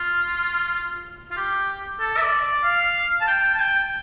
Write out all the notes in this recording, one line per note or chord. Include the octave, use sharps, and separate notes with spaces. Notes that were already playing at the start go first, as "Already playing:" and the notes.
Already playing: F4
F4
G4
A4
E5
D5
D5
F5
A5
G5
A5
G5